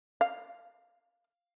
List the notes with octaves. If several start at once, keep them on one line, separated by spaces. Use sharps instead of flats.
F5